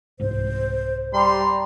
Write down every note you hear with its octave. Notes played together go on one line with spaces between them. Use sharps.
C2 G#2 C5
G3 A#5 C6